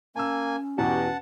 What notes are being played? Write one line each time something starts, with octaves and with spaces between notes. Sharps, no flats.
A#3 C#4 G#5 A5 E6
E2 B2 F#4 G4 F#5 A5